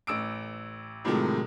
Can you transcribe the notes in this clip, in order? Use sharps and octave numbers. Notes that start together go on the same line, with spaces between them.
A1 E6 D7
A2 C3 D#3 F3 F#3 G#3